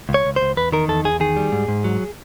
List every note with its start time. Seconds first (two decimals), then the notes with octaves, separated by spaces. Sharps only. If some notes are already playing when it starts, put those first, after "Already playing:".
0.09 C#2
0.14 C#5
0.25 C#2
0.36 C5
0.41 C#2
0.57 E2 B4
0.72 D#3 A#4
0.88 E2 A4
1.04 E2 G#4
1.20 D#3 G#4
1.36 G3
1.52 G#2
1.68 G#2
1.84 F#3